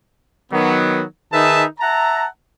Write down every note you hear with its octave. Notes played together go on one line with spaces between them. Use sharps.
D#3 F#3 B3
D#3 D#4 G#4 B4 E5 A5
E5 F#5 A5 A#5